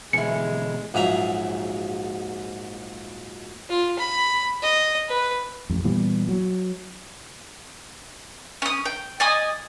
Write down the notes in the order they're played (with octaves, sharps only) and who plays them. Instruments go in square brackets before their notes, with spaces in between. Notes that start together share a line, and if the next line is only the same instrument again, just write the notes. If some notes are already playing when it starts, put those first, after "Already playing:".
[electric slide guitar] B2 D3 E3 [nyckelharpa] G#3 [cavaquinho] E4 G#5 [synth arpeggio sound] C#7
[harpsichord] A#1 G#2 F#3 E5 A#5
[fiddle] F4
B5
D#5
B4
[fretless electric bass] A1 F2
A#2 E3 G3 B3
F#3
[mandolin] C#4 D#6
G5
D5 D#5 G#5 D#6